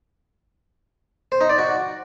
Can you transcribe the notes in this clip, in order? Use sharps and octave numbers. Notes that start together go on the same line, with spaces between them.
C5
D#4
D5
F#4